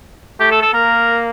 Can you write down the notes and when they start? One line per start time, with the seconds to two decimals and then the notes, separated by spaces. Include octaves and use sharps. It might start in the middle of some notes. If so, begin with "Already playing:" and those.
0.40 A3 G4
0.51 A4
0.62 A4
0.74 A#3 A#4